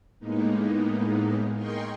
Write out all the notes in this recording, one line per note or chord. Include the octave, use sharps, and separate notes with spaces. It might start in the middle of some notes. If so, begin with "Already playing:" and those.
A2 G#3 A#3 B3 D#4
G#4 A#4 D#5 G5 C6 C#6